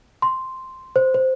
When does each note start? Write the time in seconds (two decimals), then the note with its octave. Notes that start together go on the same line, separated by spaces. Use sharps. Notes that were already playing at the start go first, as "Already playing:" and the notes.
0.22 C6
0.96 C5
1.14 C5